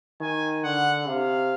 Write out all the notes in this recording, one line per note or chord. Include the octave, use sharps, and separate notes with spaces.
D#3 G#5
D3 F#5
C3 F5